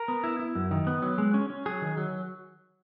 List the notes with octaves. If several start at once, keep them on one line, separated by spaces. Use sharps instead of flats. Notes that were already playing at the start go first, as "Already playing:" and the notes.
Already playing: A#4
B3
E4
E4
F#2
D#3
B3
F#3
G#3
C#4
C#4
F#3 G#4
D#3
F#3